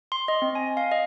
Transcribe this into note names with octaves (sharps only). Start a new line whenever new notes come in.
C6
D#5
C4
G#5
F5
D#5